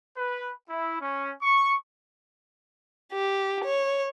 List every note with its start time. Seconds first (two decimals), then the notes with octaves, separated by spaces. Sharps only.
0.17 B4
0.70 E4
1.01 C#4
1.41 C#6
3.13 G4
3.64 C#5